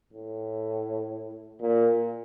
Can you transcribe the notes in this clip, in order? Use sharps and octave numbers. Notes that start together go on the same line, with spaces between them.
A2
A#2